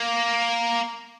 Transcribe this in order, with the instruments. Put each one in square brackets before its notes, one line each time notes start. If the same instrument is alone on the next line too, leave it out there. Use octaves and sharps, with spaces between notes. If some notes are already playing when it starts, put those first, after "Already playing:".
Already playing: [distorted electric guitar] A#3